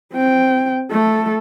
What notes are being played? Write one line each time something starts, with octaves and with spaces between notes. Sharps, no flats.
C4 G5
A3 A4